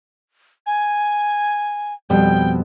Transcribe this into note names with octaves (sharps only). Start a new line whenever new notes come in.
G#5
F2 B2 G3 G5